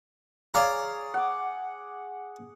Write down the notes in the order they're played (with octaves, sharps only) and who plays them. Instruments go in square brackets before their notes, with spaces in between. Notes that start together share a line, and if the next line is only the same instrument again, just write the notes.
[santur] G#4 C#5 [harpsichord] D5 F5 A#5
[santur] F#5 D6